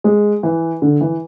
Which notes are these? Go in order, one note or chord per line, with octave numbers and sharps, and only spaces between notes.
G#3
E3
D3
E3